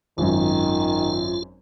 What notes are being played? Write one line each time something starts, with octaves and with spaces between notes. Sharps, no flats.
G#1 F#2 D#3 F4